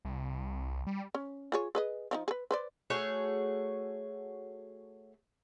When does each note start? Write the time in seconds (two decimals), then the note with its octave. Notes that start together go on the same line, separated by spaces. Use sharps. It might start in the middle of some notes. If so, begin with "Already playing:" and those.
0.05 C2
0.87 G3
1.15 C#4
1.52 F4 G#4 C#5
1.75 G#4 B4 D#5
2.11 F3 D4 D#4
2.28 G#4 B4
2.51 B4 C5 D5
2.90 A3 F#4 G#4 C#5